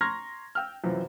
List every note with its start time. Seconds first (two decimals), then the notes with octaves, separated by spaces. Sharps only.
0.01 A#5 C6 C#6 F6 G#6 A#6
0.55 G5 E6 F6
0.84 F#2 C3 E3 F3